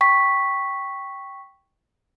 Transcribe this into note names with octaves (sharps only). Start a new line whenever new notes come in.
G5 C#6 B6